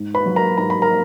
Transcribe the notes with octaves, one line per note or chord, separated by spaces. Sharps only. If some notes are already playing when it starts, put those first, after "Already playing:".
Already playing: G#2
B4 B5
F#3
A#4 A#5
G#2 A#5
B5
A#4 A#5